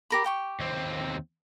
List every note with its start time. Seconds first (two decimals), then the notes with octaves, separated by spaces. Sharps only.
0.10 G4 A#4 B5
0.24 G4 G5 C#6
0.60 D#2 C4